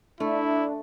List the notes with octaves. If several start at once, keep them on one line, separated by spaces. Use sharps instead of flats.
A3 D4 E4